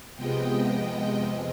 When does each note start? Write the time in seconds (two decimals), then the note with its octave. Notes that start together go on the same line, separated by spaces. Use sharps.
0.16 C3 F3 G#3 B3 D#5 G5
1.14 F2 C3 F3 G#3 C4